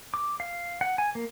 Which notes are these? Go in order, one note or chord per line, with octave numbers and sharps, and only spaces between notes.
D6
F5
F#5
G#5
A#3